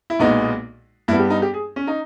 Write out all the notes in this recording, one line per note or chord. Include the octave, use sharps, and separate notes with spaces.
E4
B1 A#2 G#3 B3 D#4
G2 G3 B3 E4
G4
D#4
G4
G#4
C#4
D#4